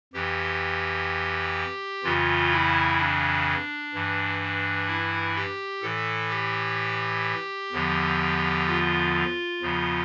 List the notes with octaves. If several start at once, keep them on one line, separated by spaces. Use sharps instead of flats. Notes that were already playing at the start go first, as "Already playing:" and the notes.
F2 E3 G4
F2 C#3 E3 F4
E4
D4
G2 E3
E4
G4
A2 E3 A4
G4
E2 D3 F3
F4
E2 C#3 F3